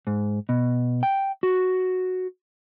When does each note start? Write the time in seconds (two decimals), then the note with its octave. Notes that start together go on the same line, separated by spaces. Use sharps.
0.07 G#2
0.49 B2
1.03 G5
1.43 F#4